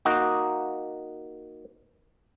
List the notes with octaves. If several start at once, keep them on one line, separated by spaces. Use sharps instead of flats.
A#3 D#4 F#4